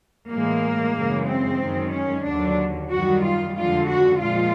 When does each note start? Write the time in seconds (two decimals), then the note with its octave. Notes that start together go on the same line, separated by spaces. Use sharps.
0.30 A2 E3 G#3 A#3
0.96 F#2 C#3 E3 G#3
1.28 C4
1.60 F#2 D#3 G#3
1.93 C#4
2.26 D#2 D3 F#3 D4
2.91 F#2 D#3 G3 F#4
3.24 F4
3.56 F2 D3 F3 G#3 F4
3.89 F#4
4.21 A#2 F3 G#3 F4